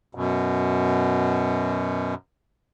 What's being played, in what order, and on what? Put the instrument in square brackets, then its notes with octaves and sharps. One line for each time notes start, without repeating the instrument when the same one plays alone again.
[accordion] F#2 B2